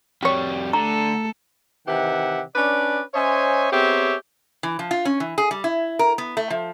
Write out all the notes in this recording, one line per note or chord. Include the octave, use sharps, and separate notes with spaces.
F2 G3 G4 C#5
D3 A3 A4 A#5
C3 D#3 E3 G4 E5 F#5
C#4 D4 B4 D5
C#4 C5 C#5 D#5 E5 G#5
B3 C4 G4 G#4 C#5 E5
E3
F3
F4
C#4
E3
G#4
G3
E4
A#4
B3
A3
F3